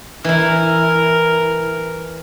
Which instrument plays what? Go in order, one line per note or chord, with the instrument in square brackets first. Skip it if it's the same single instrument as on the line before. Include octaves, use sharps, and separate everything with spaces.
[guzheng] E3 E4 [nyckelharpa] A#4